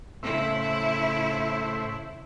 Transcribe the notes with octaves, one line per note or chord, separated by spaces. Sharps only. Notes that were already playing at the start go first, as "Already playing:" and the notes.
A2 C#3 E4 C5 E5